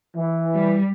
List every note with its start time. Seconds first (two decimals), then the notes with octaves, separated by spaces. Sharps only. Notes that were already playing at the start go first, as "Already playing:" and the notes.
0.16 E3
0.54 G3